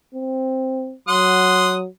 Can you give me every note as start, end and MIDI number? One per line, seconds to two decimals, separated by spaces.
0.14 0.94 60
1.08 1.86 54
1.08 1.74 78
1.08 1.74 84
1.08 1.74 87